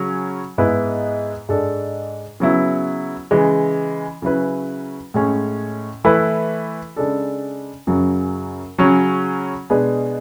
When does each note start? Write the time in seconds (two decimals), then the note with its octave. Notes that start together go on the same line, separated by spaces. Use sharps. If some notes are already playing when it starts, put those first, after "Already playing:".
Already playing: C#3 F#3 C#4
0.58 G#2 G#3 B3 E4 B4
1.49 G#2 G#3 D4 A4
2.40 C#3 F#3 B3 E4
3.31 C#3 E3 G#3
4.22 C#3 F#3 C#4 E4 B4
5.14 A2 G#3 C#4
6.04 E3 A3 E4 B4
6.96 C#3 G#3 D4 A4
7.87 F#2 C#3 F#3
8.78 C#3 F#3 C#4
9.70 B2 G#3 D4 G#4 B4